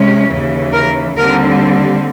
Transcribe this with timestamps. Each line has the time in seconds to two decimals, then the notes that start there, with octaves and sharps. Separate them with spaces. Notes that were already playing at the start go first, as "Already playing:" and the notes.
Already playing: C3 G#3 C#4
0.29 D#2 C#3 E3
0.72 A#4
1.16 D#2 D3 G3 C4 A#4